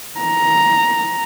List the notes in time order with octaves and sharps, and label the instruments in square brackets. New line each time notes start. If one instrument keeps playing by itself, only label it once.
[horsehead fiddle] A#5